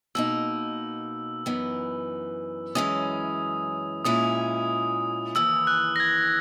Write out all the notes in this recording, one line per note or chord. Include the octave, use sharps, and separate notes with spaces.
B2 A#3 D#4 E6
F#2 E3 B3 D#4
F#2 E3 G#3 C#4 D#6
A#2 G#3 C#4 E4 D#6
D#2 C#3 E3 E6
F#6
A#6
G#6